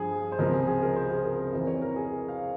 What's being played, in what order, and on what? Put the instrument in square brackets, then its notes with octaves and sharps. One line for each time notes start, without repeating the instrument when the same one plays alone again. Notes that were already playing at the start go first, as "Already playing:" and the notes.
Already playing: [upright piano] G2 F3 G#4
C5
C#2 C3 F3 A#4
G#4
G#4
A#4
C5
G#4
A#4
A#4
F2 E3 A#4
C#5
A#4
G#4
A#4
F5